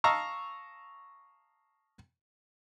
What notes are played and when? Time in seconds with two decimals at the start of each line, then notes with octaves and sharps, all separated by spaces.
0.04 D#5 F5 A5 A#5 C#6 E6